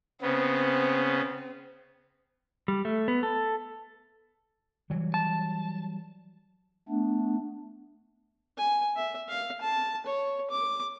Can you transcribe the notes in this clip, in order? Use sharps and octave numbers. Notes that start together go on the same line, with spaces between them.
C#3 B3 C4
G3
A3
B3
A4
E3 F#3 G3
A5
A3 B3 D4
G#5
E5
F5
A5
C#5
D6